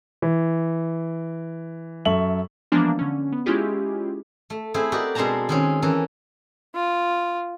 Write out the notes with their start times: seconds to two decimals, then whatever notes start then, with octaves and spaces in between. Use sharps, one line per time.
0.22 E3
2.05 F#2 A4 E5 C#6 F#7
2.72 E3 F3 G#3 A#3 B3 D4
2.99 D3 C#4
3.33 B3
3.46 G#3 C#4 E4 F4 G4 G#4
4.50 A3
4.74 A3 C4 E4 G#4 C5
4.92 F#4 G4 A#4 D5 D#5
5.15 B2 G#3 C4 D4 A5 A#5
5.49 D#3 C4 C#4
5.82 E3 C#4 A4 A#4
6.75 F4